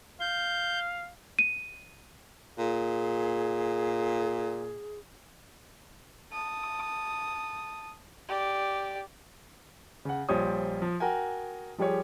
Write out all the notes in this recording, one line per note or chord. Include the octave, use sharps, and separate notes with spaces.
F5 G6
D#7
A#2 G#4
A5 D#6
G4 D5
C#3 F#5
A#1 F3 G3 C5 C#5 D#6
F3
F#4 A#4 G5 G#5
F3 G3 G4 G#4 C#5